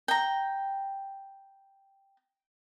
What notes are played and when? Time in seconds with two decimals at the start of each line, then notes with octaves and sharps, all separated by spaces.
0.08 G5 A#5